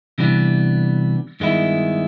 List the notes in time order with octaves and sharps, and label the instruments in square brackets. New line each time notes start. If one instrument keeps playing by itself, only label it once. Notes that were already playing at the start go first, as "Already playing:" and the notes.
[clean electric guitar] C3 E3 G3 B3 D4
G2 D#3 G#3 B3 E4